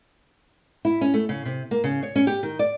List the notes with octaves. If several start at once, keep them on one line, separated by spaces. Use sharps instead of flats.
E4
C#4
A3
C#3
C3
A#3
C#3
C#5
C#4
G4
D#3
D5